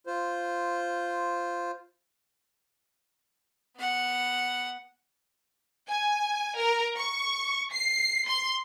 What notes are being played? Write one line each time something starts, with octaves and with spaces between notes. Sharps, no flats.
F4 C5
B3 F#5
G#5
A#4
C#6
C7
C6